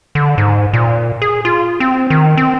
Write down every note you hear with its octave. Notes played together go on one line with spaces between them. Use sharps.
D3
G#2
A#2
G#4
F4
C4
D#3
C4